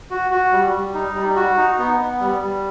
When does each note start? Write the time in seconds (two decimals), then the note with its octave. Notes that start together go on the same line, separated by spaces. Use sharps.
0.10 F#4
0.31 F#4
0.52 G3
0.74 G3
0.94 D#4
1.15 G3
1.36 F#4
1.57 D#4
1.79 B3
2.00 B3
2.20 G3
2.41 G3